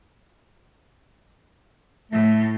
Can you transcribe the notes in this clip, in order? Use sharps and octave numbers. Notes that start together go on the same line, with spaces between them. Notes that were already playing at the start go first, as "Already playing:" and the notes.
A2 A3